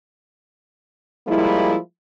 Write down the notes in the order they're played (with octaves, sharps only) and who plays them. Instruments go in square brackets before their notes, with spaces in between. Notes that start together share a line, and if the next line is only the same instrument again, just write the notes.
[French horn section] F3 G3 G#3 A#3 E4